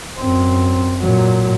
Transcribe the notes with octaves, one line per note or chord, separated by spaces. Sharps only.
F#2 C4
A#2 F#3